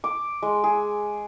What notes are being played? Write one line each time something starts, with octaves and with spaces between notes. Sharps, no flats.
D6
G#3
G#4